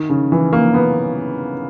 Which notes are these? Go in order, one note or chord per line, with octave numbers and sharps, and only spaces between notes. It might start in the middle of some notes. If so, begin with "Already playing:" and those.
Already playing: D#3
C#3
E3
A#3
B3